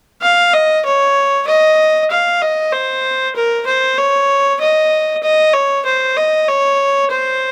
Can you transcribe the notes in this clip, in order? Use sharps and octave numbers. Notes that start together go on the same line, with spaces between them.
F5
D#5
C#5
D#5
F5
D#5
C5
A#4
C5
C#5
D#5
D#5
C#5
C5
D#5
C#5
C5